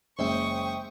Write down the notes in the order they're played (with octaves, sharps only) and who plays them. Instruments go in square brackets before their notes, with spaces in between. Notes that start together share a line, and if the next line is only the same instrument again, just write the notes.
[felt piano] F#1 G#3 C#4 [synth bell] C5 E5 G5 [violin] C#6 D#6